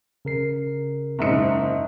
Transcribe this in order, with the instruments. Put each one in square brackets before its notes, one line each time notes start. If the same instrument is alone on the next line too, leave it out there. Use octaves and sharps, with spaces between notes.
[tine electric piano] C#3 A#4 C7
[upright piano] F#1 G#2 C#7 [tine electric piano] D#5 E5 A#5